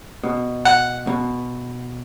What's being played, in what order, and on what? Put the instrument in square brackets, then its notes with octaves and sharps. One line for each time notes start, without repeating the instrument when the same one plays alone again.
[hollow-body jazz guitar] B2
[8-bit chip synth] F#5
[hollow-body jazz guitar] B2